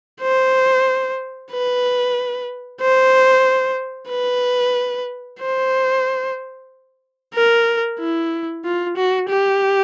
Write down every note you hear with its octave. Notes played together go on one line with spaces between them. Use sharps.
C5
B4
C5
B4
C5
A#4
E4
F4
F#4
G4